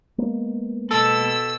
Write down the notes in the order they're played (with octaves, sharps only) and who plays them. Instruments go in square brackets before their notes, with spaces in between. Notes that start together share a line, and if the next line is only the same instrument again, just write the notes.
[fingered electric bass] G#3 A#3 B3
[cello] B2 [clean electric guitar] A4 [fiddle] E6